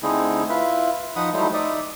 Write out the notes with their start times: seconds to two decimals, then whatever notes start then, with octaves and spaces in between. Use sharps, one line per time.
0.03 D3 A3 C4 D#4 E4 G#4
0.50 E4 F4 B4 E5
1.16 F3 D#4 F#5 B5 D#6
1.34 F#3 G3 A3 D#4 E4 C5
1.54 D#4 D5 E5 D#6